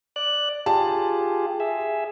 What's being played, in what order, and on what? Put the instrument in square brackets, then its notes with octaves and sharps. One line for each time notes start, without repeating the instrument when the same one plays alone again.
[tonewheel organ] D5 F#6
[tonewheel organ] F4 G4 G#4 [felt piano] A5
[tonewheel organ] G#4 E5